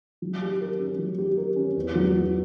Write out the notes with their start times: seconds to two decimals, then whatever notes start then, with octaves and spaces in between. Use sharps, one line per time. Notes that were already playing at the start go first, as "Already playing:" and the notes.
0.22 F#3
0.41 G4
0.61 A#4
0.80 C#4
0.99 F#3
1.18 G4
1.37 A#4
1.56 C#4
1.76 E2
1.95 F#3
2.14 E2